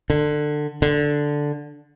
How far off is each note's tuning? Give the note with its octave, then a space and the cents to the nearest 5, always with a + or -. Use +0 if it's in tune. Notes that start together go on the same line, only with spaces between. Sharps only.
D3 +20
D3 +0